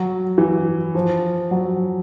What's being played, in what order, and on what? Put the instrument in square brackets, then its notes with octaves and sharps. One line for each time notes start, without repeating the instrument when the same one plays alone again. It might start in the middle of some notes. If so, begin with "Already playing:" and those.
Already playing: [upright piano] F#3
E3
F3
F#3